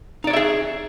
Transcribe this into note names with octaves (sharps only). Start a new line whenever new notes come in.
D#4 G#4 C#5 D5 E5